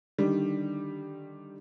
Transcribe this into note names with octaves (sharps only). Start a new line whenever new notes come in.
D3 D#3 G3